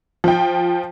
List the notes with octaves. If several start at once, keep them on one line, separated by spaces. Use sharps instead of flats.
F3 G5